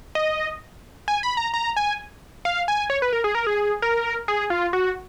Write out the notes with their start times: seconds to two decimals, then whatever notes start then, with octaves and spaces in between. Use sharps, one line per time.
0.15 D#5
1.08 G#5
1.23 B5
1.37 A#5
1.54 A#5
1.76 G#5
2.45 F5
2.68 G#5
2.90 C#5
3.02 B4
3.13 A#4
3.24 G#4
3.35 A#4
3.47 G#4
3.82 A#4
4.28 G#4
4.50 F4
4.73 F#4